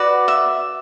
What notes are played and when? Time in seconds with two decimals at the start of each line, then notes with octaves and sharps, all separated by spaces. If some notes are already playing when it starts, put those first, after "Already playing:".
Already playing: F#4 B4 D5
0.28 E5